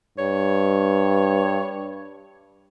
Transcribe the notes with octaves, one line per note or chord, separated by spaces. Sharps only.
G2 C#5